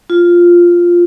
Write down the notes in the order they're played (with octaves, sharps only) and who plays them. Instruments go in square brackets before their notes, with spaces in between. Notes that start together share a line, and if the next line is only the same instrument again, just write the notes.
[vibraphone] F4